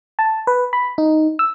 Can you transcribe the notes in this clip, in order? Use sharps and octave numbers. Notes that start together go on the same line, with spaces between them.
A5
B4
B5
D#4
E6